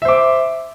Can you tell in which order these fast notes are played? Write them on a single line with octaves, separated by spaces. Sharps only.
E5 C5 D6